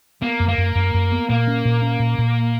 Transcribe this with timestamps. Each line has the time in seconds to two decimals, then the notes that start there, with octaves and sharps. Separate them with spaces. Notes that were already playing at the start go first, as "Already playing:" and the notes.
0.22 A#3 B3
0.40 F#2
0.49 A#3
0.58 F#2
0.75 F#2
0.94 F#2
1.12 B3
1.29 A#2 A#3
1.47 C#4
1.65 A#2
1.82 C#4
1.99 A#2
2.18 A#2